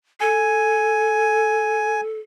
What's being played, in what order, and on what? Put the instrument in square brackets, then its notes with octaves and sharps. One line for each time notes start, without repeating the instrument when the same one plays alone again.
[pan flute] A4 [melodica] G#5